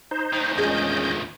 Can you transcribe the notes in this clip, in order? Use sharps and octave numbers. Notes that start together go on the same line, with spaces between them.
D#4 C5
D2 D#3
E2 F3 G#3 C#4 D#5 G6